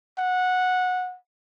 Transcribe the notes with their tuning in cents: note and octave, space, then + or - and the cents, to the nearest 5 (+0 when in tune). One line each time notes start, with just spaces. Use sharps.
F#5 -15